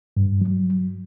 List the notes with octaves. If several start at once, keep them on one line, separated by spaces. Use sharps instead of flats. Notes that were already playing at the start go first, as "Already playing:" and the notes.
G2
F#3